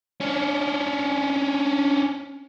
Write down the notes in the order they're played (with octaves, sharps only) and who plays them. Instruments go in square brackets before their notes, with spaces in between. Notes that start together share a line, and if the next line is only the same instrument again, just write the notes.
[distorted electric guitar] C#4 D4